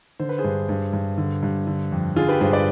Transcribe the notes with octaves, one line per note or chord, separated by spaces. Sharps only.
D3 C5
B4
G#4 C5
G2
G2
G2
D3
G2
D3
F2
D3 F4 G#4
G4 B4
G2 G#4 C5
B4 D5